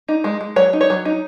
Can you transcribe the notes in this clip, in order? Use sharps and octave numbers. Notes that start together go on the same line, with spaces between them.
D#4
G#3
G#3
F#3 C#5
D#4
C#5
F#3
D#4